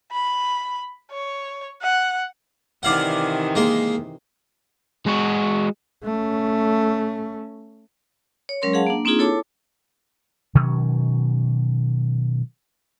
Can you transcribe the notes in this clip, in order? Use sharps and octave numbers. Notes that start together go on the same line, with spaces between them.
B5
C#5
F#5
C3 D#3 E3 D5 F5 F#5
G#3 A#3 C6
G#3 F#4
A3 C#4
C#5
F#3 G#3 C#4 A#4 C#5 C6
G#4 F5 F#5 A5
A#3 D4
A#3 C4 D4 D#4 F4 G#4
E4 A4 C#5 A5 D6
B2 D#3 F#3 C#4